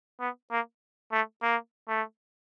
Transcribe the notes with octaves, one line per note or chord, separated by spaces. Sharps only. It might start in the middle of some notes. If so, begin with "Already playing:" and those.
B3
A#3
A3
A#3
A3